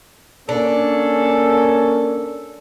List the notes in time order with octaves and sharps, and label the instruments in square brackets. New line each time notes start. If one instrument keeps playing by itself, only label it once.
[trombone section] A#3 C#4 [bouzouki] D4 [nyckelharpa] A4